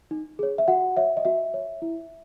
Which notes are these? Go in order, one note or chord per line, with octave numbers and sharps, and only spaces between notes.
D#4
G#4 C#5
E5
F#4 F#5
C#5 E5
D#5
F#4 E5
C#5
E4